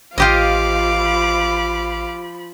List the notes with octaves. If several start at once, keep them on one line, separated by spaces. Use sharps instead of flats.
A1 F3 F4 G4 D#5 F5 B5 D6